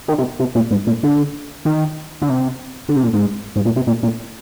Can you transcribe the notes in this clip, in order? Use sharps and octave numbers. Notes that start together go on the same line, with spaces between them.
D#3
C3
C3
A#2
G#2
A#2
D3
D#3
D3
C3
D3
C3
A#2
G#2
G#2
A#2
C3
A#2
A#2